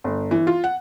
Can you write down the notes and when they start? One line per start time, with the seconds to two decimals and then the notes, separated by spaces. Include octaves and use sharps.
0.04 G1
0.31 E3
0.47 F4
0.64 F#5